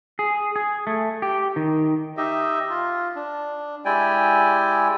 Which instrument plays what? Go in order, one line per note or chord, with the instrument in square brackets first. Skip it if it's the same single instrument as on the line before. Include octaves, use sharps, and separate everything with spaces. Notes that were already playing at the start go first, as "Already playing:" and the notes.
[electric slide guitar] G#4
G#4
A3
G4
D#3
[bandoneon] D#4 G4 D#5 E5
F4
D4
G#3 E4 G4 D5 G5 G#5